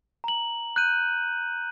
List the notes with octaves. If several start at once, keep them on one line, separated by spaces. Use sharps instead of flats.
A#5 F#7
F#6 G6 D#7